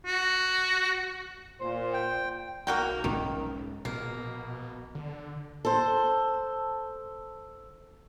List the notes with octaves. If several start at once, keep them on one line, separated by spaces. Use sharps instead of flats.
F#4
A#2 C5
G5
B1 A#3 F#4 G5
G#2 D#3 G#3 C#4
A#1 B2 A#3
D3
A4 C5